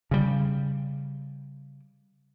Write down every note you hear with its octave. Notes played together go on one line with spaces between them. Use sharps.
C#3 G3